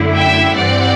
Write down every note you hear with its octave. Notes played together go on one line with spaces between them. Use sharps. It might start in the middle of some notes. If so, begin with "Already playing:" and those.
Already playing: F#2 D3 A3 E4
E5 G5
G2 E3 G3 C4 D5 F#5